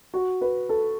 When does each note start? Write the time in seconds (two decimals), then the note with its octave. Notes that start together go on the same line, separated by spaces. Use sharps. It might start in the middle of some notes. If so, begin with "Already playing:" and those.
0.14 F#4
0.41 B4
0.69 A4